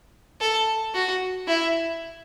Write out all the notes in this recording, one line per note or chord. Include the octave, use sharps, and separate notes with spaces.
A4
F#4
E4